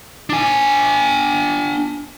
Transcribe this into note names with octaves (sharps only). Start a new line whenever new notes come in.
D4 G#5